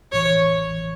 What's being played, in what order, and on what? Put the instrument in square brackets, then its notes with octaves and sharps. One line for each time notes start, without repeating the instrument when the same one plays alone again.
[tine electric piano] A1 A2 E3 [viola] C#5
[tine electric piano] A1 A2 E3